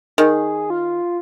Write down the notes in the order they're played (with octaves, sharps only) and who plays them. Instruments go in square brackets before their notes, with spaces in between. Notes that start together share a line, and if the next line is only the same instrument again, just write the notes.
[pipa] D#3 [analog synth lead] G#4
[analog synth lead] F4